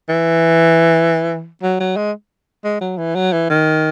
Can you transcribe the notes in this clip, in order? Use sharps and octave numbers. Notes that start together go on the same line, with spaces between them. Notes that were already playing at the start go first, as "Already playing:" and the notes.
E3
F#3
F#3
G#3
G#3
F#3
E3
F#3
E3
D#3